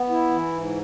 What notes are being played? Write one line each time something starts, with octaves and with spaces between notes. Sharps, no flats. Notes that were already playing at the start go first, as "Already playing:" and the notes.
Already playing: B3
E4
E3
G#2